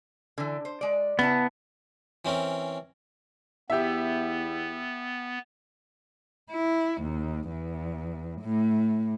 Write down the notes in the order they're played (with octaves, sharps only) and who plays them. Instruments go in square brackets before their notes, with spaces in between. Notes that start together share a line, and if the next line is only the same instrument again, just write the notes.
[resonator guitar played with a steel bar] D3 E3
C5
G#3 D5
[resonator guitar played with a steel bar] C#3 E4 A5 [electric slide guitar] B3
[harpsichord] E3 C4 C#4 A#4
[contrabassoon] E2 [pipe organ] B3 [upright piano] G4 E5
[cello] E4
D#2
E2
A2